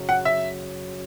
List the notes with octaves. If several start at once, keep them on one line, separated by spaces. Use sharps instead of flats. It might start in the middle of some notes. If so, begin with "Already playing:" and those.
Already playing: F#2 C#3 F#3
F#5
E5